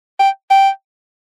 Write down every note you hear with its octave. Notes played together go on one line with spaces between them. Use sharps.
G5
G5